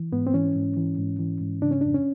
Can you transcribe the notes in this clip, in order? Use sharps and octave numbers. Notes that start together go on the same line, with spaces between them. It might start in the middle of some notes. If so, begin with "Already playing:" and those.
Already playing: E3
G#2 B3
C4
E3 C#4
G#2
E3
G#2
E3
G#2
C#3 D4
C#4
F2 D4
C#4